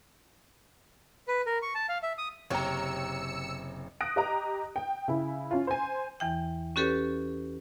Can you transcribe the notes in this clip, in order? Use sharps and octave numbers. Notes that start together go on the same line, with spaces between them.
B4
A#4
C#6
A5
F5
E5
D#6
F#1 C3 C#5 G5 A#5 E6 C#7
D#6 F#6 A#6 D7
G4 D#5 A#5
G5
C#3 E4
C#4 F4
C5 G#5
E2 E3 G5
C#4 F#4 G4 A4 B4 C#5